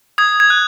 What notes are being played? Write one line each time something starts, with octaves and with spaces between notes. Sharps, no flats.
D#6 G#6
G#6
F#6